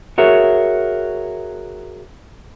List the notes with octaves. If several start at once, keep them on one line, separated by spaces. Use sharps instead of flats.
F#4 G#4 A#4 C#5 E5